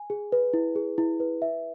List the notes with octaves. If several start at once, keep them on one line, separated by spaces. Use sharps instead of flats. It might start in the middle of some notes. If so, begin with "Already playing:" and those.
Already playing: G#5
G#4
B4
E4
G#4
E4
B4
E5